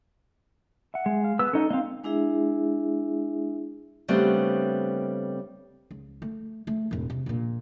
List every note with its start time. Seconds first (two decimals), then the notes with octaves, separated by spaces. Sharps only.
0.94 E5 F#5
1.06 G#3
1.24 F5
1.39 B3 B4 E6
1.53 C#4 D#4 A4 D#5
1.70 A#3 C4 D#5 F5
2.04 G#3 D4 E4 G#4 E5
4.08 C#3 G3 A3 B3 C4 D4
5.91 C#2
6.22 A3
6.67 A3
6.91 E1 A2
7.10 C3
7.26 A#1 A#2